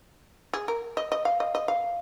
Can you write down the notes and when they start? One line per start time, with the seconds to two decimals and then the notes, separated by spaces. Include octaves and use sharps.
0.53 G#4
0.68 A#4
0.97 D#5
1.12 D#5
1.25 F5
1.40 D#5
1.55 D#5
1.68 F5